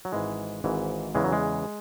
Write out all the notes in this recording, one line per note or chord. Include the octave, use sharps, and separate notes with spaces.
F#3
G#1 G#2 E3 G#3
G#1 G#2 E3
E2 C#3 E3 G#3
F#3
G#3